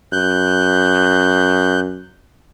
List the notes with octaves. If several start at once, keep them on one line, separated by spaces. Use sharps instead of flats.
F#2 F#6 G6